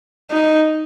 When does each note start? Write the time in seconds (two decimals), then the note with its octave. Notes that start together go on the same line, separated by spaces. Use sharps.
0.31 D#4